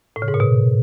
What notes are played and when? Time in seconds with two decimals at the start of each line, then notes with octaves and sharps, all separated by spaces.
0.16 A2
0.22 C#3
0.28 G#2
0.34 A#2
0.40 B2